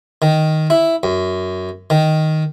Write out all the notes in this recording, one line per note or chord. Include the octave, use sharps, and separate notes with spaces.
D#3
E4
F#2
D#3